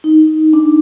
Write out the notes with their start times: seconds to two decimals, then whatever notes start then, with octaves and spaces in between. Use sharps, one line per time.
0.04 D#4
0.53 D4